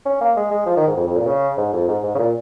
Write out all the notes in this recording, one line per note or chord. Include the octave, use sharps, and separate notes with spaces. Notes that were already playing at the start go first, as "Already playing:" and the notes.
C#4
A#3
G#3
G#3
F3
D#3
G#2
F2
F2
A#2
C#3
G#2
F2
G#2
G#2
C#3
A#2